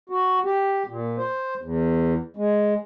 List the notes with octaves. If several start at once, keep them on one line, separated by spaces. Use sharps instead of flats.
F#4
G4
A#2
C5
E2
G#3